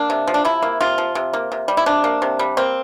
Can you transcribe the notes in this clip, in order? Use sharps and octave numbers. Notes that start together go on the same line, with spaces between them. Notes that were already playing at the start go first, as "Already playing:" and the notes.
Already playing: A#3 D4
C3
F3
D4
C3 E4
A#3
C3 F4
F3
C3
A#3
C3
G3
E4
C3 D4
A#3
C3
G3
A#3 C4